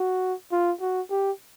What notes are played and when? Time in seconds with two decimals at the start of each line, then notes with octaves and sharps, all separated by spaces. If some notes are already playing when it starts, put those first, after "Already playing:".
Already playing: F#4
0.52 F4
0.81 F#4
1.11 G4